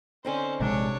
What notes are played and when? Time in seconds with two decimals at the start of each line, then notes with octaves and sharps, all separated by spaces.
0.25 D3 C4 C#4 D#4 C5
0.60 A#1 C3 G#3 D4 C#5